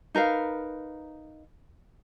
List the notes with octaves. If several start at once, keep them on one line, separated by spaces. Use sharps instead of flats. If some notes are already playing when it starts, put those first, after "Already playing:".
D#4 A#4 B4 F5